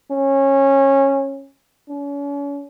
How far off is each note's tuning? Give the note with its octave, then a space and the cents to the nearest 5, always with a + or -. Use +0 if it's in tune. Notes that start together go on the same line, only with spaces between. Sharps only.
C#4 -20
C#4 +40